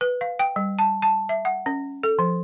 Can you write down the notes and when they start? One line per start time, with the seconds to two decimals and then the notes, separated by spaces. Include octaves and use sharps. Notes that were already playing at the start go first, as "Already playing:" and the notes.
0.01 B4
0.21 F5
0.39 G5
0.56 G3
0.79 A5
1.02 A5
1.29 E5
1.45 F#5
1.66 C#4
2.03 A4
2.19 F3